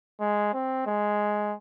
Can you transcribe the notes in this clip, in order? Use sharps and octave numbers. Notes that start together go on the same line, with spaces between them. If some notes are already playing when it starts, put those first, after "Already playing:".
G#3
C4
G#3